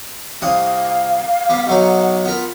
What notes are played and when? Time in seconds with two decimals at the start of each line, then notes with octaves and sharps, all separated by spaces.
0.42 C2 F5 F#5 D#6
1.49 G3 B3
1.67 B1 F#3 D#4 F#5
2.25 B3 F4 A#4